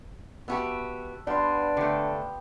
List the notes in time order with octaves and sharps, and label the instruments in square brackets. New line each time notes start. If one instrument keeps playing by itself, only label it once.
[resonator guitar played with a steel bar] B3 F#4 G4 [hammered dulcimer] E5 A5
[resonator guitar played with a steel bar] G3 [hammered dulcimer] B3 F5 C6 [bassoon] D4
[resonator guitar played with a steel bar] D3 A3 [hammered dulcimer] G4